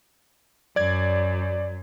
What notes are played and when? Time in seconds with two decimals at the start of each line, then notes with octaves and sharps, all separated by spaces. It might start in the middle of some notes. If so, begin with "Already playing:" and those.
0.76 F#2 D5 G#6